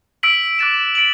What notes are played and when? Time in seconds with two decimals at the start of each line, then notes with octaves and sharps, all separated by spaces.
0.23 E6 B6 D7 F#7
0.59 D6 F#6 A6 E7
0.95 B6 D7 F#7